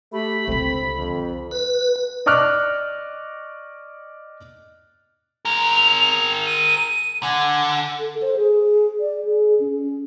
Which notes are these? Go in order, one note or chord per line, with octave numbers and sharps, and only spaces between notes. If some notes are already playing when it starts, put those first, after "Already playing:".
A3 G4 B5
C#2 D3 C4 A4
F2
B4
D5 D#5 C#6 D6 F6 F#6
G#4 A#4 F7
D#7
D3 G#5
A4
C5
G#4
D5
G#4
C#4